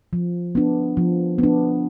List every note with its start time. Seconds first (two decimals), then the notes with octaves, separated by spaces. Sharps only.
0.13 F3
0.55 B3 D4
0.97 F3
1.38 B3 D4